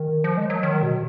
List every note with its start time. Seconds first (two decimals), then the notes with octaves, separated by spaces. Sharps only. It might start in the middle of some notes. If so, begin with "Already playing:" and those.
Already playing: D#3
0.24 F3
0.37 G#3
0.50 F#3
0.63 D#3
0.83 B2